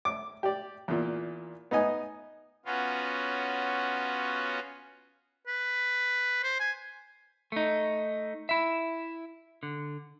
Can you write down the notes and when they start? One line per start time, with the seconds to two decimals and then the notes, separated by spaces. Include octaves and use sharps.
0.05 D6
0.43 G4 D5
0.88 E2 A#2
1.71 B3 D#4 D#5 G#5
2.66 B3 C#4 F4 F#4
5.47 B4
6.43 C5
6.60 G#5
7.52 A3 D#4
8.49 E4 E5
9.63 D3